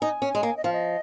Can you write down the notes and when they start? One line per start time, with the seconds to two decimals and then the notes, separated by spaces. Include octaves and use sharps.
0.01 D#4 G#5
0.22 C#4
0.29 G#5
0.35 G#3
0.43 A#3
0.57 D#5
0.64 F3 F5
0.73 D#5